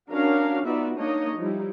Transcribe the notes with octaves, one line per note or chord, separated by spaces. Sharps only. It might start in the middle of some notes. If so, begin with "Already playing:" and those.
C#4 D4 F#4 A#4 C#5 F5
B3 D#4 F4 F#4 D5 E5
A#3 D4 D#4 C#5 D#5
F3 G3 D#4 E4